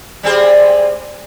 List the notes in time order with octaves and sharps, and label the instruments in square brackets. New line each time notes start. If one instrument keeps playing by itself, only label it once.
[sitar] G3 C4 G#4